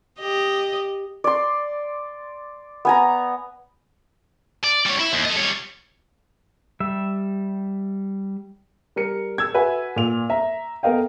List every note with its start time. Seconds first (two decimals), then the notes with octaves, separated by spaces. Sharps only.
0.19 G4 D#5
1.24 D5 C6
2.85 B3 G#5 A#5
4.64 D5
4.86 G3 C#5
5.00 E4
5.12 D#2
5.25 A4 D#5
5.37 G3 C#5
6.80 G3 E5
8.96 G3 A#4 C#7
9.38 E6 G#6
9.54 F#4 B4 E5 F#5 G#5
9.96 A#2 F7
10.30 E5 A#5
10.83 B3 A4 A#4 D#5 F5 G5